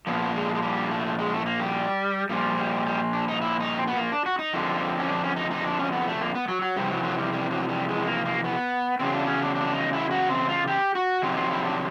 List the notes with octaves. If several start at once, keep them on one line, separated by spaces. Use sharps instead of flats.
A#2 F3 B3
G#3
G#3
G3
A3
G#3
A3
A#3
G3
A#2 F3 G3
G3
G3
D4
D#4
E4
D#4
C4
B3
A#3
D4
F#4
D#4
F2 D3 F3
C#4
D4
C#4
D#4
D#4
D4
C#4
B3
A3
A#3
B3
F#3
F#3
F2 C3 E3 G3
F#3
F#3
G3
G3
F#3
G3
G#3
A#3
A#3
B3
E2 C#3 F#3 C4
D4
C#4
D4
D4
D#4
E4
F#4
C4
F4
G4
F#4
F2 C3 D#3 F#3 F4
F4
E4
D4